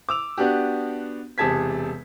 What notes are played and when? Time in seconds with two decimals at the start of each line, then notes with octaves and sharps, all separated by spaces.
0.09 D6 E6 F7
0.38 B3 D4 F#4 G4
1.38 E1 C3 G#4 A5 G#6 B6